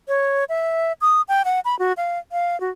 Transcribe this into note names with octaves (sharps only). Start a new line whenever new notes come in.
C#5
E5
D#6
G5
F#5
B5
F#4
F5
F5
F#4